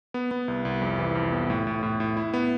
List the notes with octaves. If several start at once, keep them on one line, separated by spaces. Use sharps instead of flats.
B3
B3
C2
C2
F2
E3
F2
B3
A2
A2
A2
A2
E4
B3